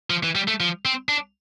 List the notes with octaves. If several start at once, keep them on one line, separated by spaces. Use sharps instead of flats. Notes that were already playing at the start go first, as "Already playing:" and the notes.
F3
E3
G3
A3
F3
C4
D4